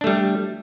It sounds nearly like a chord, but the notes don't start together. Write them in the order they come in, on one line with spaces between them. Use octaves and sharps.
D4 A3 G3